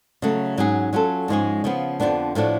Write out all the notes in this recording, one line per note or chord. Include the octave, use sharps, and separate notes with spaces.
C#3 F#3 A3
G#2 F#3 C#4 G#4
F#3 C#4 F4 A4
G#2 F3 G#3 C#4 G#4
C#3 F3 B3
F2 D3 F3 B3 D4
A2 F3 A3 D4 F#4